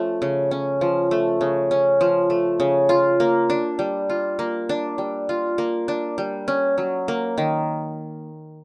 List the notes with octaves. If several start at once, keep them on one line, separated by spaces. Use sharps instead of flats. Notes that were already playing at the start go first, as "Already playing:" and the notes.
Already playing: F3 A3 C#4
C#3
C#4
F3
A3
C#3
C#4
F3
A3
C#3
F4
A#3
D4
G3
F4
A#3
D4
G3
F4
A#3
D4
G3
C#4
F#3
A#3
D#3